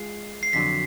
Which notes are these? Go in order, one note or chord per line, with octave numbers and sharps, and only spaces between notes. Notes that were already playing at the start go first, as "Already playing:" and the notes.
Already playing: G#3 F4 C7
C7
F2 D3 F#3 B6